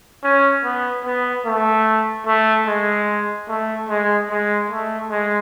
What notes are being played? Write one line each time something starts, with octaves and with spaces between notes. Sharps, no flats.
C#4
B3
B3
A3
A3
G#3
A3
G#3
G#3
A3
G#3